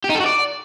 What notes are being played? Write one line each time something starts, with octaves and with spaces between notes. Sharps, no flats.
G4
D#4
A4
F#4
D5